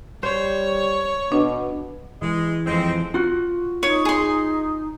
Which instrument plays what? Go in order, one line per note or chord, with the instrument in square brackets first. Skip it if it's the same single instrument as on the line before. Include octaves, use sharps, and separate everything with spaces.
[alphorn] G3 [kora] C5 [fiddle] C#5
[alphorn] B2 [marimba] D4
[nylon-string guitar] E3 [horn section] G#3
[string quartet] F2 G#3 [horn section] C4
[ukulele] F4 F#4
[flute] D#4 [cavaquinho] C#5
[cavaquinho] G#4 C6